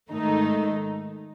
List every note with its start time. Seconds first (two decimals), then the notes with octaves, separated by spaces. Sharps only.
0.11 G#2 D#3 A3 D#4